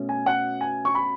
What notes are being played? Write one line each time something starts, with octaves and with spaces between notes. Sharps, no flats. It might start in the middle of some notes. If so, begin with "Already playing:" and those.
Already playing: B2 A3 C#4
G#5
F#5
G#5
C#6
B5